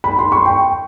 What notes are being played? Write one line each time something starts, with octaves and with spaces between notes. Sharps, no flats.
B5
C6
C#6
G5